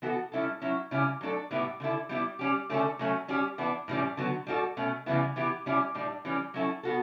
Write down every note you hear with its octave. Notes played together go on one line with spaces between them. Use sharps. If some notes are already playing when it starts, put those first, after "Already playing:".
E3 B3 F#4 A4
G3 C#4 E4 A4
F#3 C#4 E4
C#3 G3 C#4 E4 G4
F#3 A3 D4 A4
A2 G3 B3 E4 G4
D3 A3 E4 A4
G3 B3 E4 G4
G3 C#4 G4
D3 A3 C#4 E4 A4
F#3 A3 C#4
G3 C#4 G4
E3 B3 D4
A2 E3 G3 C#4
D3 F#3 B3
G3 D4 F#4 A4
B2 A3 C#4
C#3 E3 G3 B3 E4
E3 B3 E4 G4
G3 C#4 E4 G4
A2 G3 D4
E3 G3 C#4
F#3 C#4 E4 A4
B3 F#4 A4